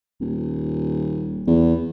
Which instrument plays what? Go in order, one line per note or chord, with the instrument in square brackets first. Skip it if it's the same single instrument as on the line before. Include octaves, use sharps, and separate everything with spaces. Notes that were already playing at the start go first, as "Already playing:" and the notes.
[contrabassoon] D#1
E2